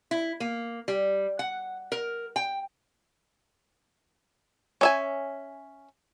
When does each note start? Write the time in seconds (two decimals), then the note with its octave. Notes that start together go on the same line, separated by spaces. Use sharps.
0.11 E4
0.40 A#3
0.88 G3
1.39 F#5
1.92 A#4
2.36 G5
4.81 C#4 E5 G#5